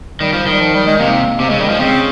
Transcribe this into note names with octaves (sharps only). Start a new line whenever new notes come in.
D#3 G3
F3
D#3
G3
F3
G3
G#3
C3 A#3
C3 A#3
C#3 G#3
D#3 G3
F3 G#3
C#3 C4